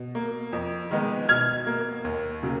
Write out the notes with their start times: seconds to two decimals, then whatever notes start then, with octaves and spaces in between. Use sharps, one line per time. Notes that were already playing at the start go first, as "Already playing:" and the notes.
Already playing: B2
0.15 A#3
0.53 F2
0.91 D#3 G#3 B3
1.29 B2 F6 G#6
1.67 A#3
2.04 D#2
2.43 C#3 F#3 A#3